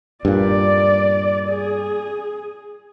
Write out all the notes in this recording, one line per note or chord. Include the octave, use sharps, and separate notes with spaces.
G2 A#2 D5
G#4